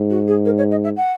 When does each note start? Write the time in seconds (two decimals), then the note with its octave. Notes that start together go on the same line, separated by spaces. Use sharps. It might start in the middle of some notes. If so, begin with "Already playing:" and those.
Already playing: G#2
0.10 F#4
0.27 G#4
0.45 A#4
0.58 C#5
0.71 D#5
0.84 E5
0.97 F#5